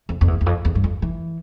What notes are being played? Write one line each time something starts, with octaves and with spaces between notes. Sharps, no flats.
F2
F2
E2
E2
F2
E2
G2
F2
E3